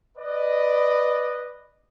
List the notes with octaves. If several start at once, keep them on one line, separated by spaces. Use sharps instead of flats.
B4 D5 D#5